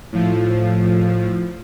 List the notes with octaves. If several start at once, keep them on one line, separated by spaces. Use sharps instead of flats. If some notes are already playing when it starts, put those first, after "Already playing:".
A2 F3